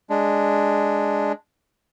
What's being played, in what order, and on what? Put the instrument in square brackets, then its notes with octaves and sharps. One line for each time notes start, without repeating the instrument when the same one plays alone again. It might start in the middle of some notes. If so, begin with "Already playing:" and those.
[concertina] G#3 D4